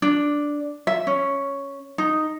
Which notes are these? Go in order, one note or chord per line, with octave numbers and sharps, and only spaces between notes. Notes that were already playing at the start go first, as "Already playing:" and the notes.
D4
E5
C#4
D#4